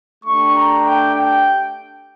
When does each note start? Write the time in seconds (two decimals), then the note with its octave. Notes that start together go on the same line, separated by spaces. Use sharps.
0.25 A3 D4 G4 C#6
0.54 A#5
0.85 G5
1.15 G5